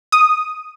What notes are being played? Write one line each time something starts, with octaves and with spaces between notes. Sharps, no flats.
D#6